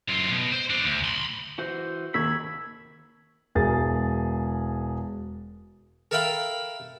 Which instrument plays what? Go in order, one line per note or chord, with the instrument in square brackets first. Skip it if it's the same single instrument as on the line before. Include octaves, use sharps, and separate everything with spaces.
[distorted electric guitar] F#2 F4
B2
C5
D4 C5
D2
B5 C6
[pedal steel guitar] E3 F#4 C5
[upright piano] D#2 A#3 C#6 [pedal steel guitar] B5 [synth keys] E6 G#6
[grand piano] E1 G#4 A#4 A6
[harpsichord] A4 A#4 E5 F5 G5 B5